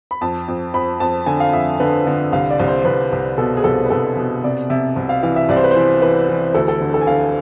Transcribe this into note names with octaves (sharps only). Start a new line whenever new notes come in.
B5
F2 A5
F2
F2 B5
F2 A5
D3 G#5
F5
F2 E5
D3 B4
D3
C2 F5
D5
C2
C5
C2 B4
C2
B2 A4
G#4
C2 A4
B4
C2 A4
B2
C3 D5
C3 E5
C2
F5
E3 F5
E5
C2 D5
C5
B4
E3 C5
E3 B4
E3
D2 A4
A4
D3
A4
G#5
D3 F5